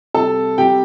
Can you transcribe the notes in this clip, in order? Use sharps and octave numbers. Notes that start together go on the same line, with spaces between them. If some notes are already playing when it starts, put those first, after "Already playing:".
C3 G3 A4 A5
C3 G3 G4 G5